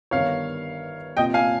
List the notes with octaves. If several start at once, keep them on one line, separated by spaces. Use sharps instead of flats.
G1 G2 D#3 C#5 F5
C2 A#2 D#5 G5
F5 G#5